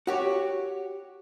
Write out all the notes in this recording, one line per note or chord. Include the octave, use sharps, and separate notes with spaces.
F#4 G4 C#5